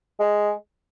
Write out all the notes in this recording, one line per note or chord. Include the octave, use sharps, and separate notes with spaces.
G#3